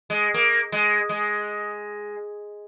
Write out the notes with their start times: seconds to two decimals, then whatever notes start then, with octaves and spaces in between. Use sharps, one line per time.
0.10 G#3
0.34 A#3
0.72 G#3
1.09 G#3